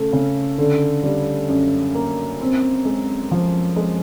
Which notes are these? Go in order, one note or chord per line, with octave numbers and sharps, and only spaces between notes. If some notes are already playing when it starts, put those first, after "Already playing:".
Already playing: C#3 A3
C#3
D3
G3
F#2
A#3
C4
G#3
F3
G#3